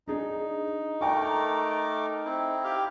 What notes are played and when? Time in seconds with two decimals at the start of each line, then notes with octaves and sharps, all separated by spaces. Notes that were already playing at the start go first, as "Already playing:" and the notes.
0.08 D4 D#4 G#4
1.01 A3 A#4 D#5 G5 C#6 D6
2.25 C4 E4
2.64 G4 F5